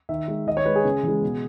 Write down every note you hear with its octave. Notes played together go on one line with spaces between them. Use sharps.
D#3 E5
G#3
D#3 D#5
C#5
G#3 B4
G#4
C#3
E3
G#3
B2